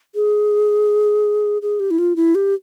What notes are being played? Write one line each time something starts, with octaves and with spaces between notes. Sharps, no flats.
G#4
G#4
G4
E4
F4
E4
G4